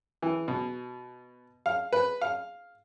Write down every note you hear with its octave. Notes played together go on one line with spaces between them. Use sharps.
E3
B2
F5
B4
F5